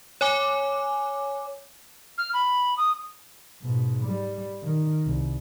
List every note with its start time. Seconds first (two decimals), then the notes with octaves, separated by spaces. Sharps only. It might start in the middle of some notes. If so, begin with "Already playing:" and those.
0.21 C#5 G#5 D6
2.18 F6
2.34 B5
2.77 D#6
3.62 G#2 B2
4.05 G3
4.63 D#3
5.06 C2